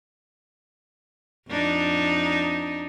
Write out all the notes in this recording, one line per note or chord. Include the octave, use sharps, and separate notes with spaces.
F2 D4 D#4